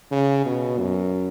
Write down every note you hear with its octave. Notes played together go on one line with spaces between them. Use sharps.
C#3
B2
F#2